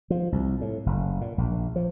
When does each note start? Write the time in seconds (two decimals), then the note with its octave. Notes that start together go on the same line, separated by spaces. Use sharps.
0.10 F3
0.32 C2
0.61 A2
0.86 F#1
1.21 A#2
1.38 A#1
1.76 F3